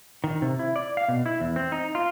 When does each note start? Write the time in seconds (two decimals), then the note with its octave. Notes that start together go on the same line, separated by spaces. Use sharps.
0.24 D#3
0.42 C3
0.59 E4
0.76 D5
0.97 F5
1.08 B2
1.26 E4
1.40 E2
1.56 C4
1.72 D#4
1.95 F4